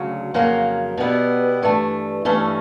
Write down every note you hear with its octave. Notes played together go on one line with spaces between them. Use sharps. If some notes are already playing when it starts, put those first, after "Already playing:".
Already playing: D2 C#3 F#3
F2 C#3 F#3 A#3
B2 G3 B3 E4
G2 E3 A3
G2 E3 A3 C#4